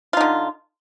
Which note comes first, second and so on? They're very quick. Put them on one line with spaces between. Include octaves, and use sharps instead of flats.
F4 D#4 D3